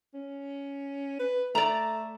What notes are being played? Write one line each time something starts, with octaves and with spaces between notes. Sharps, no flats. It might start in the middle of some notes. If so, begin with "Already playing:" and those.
C#4
B4
A3 D5 A#5